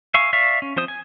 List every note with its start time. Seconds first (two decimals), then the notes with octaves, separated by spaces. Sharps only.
0.14 E5 F5 G#5 C#6
0.33 D5 E5 F5 C#6
0.62 C#4
0.76 F3 C4 C5 D#6
0.88 G#5